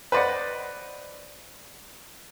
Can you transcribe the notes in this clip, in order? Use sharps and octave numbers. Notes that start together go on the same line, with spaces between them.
B4 C5 D5 D#5 F#5